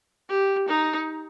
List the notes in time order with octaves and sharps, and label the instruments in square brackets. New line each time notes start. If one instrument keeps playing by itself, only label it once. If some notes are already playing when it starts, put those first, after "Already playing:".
[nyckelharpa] G4
D#4